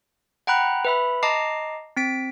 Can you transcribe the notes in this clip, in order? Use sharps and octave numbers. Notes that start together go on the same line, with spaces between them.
F#5 G5 A#5 B5 F#6
B4 E5 B5
D#5 A5 A#5 D6 C7
C4 B6 D7